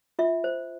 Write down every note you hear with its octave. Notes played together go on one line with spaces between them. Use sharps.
F4 E5
C5